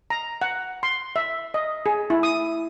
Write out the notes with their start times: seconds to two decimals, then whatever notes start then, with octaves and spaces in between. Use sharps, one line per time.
0.10 A#5
0.42 F#5
0.83 C6
1.16 E5
1.54 D#5
1.86 G#4
2.10 E4
2.23 D#6